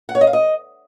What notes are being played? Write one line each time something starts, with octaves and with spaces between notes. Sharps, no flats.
F#5
C#5
D#5
F5
D#5